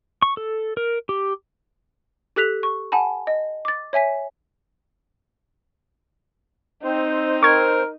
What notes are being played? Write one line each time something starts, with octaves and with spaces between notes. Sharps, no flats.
C#6
A4
A#4
G4
G4 A4 F#6 B6 F7
C#6
F#5 G#5 A5 B5
D#5
D6 A6
C#5 E5 G#5 B6
C4 D#4 C5
A#4 C#6 G#6